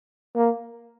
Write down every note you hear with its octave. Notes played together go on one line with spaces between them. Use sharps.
A#3